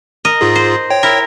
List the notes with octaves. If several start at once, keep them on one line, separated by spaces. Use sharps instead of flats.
A#4 D#5
G#2 F4 G#4
C5
C#5 G5
E4 A#4